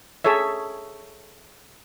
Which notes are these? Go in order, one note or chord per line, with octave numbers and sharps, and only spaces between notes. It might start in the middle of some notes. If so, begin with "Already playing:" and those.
G#4 A4 C#5 E5